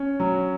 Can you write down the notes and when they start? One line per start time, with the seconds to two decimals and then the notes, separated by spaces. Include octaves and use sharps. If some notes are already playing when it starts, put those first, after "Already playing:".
Already playing: C#4
0.20 F#3